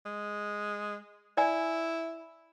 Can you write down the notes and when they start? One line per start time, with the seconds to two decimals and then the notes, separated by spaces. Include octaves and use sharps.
0.06 G#3
1.37 E4 D5 G#5